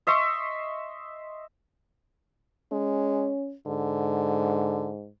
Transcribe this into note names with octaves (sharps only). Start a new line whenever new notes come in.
D#5 E5 C6 C#6
G#3 C#4
G#2 D3